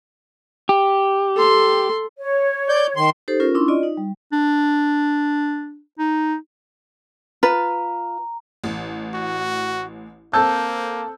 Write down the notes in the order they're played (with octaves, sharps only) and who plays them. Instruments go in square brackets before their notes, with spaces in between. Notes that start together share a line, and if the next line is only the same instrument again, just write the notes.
[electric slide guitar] G4
[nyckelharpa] A4 C6
[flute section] C#5
[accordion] D5 G6
D#3 C6
[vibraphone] D#4 G4 A4 C5
C#4 F4 A#4
C#4 D4 E4 C6 C#6
F4 D5 D#5
D#4
G3
[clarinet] D4
D#4
[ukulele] F4 B4 [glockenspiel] A#5
[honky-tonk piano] A1
[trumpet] F#4
[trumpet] A#3 [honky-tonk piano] C4 A4 [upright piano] A5 E6 G6